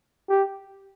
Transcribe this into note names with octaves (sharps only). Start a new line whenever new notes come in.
G4